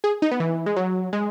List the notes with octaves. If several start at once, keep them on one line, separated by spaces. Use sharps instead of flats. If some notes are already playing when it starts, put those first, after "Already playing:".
G#4
D#4
B3
E3
G#3
F#3
G#3